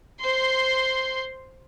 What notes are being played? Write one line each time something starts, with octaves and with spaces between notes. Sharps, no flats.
C5 C6